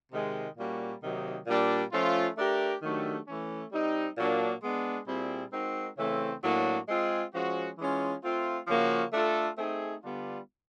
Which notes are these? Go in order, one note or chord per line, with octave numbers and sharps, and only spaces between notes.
C3 D#3 G#3
A#2 G3 A#3 C#4 F#4
C3 D#3 F#3 A#3 D#4
A#2 G3 A#3 D4
F3 A3 C#4 F4
A3 D4 G4 A#4
D#3 F#3 A3 D4 G4
E3 A3 C#4
G3 C4 D#4
A#2 F#3 A#3 D4
G#3 B3 D4
A#2 G3 C4 E4 G#4
G#3 C4 D#4 F#4 A#4
C#3 E3 A3 C4
A2 F#3 A#3 D4 F#4
G#3 C4 F4 G#4
F3 G#3 C#4 F#4
E3 G#3 C#4 F4
A3 C4 F4
C#3 F3 A#3 C#4 F#4
A3 D4 F4 A4
A3 C4 D#4 G#4
D3 G3 B3 D4 F4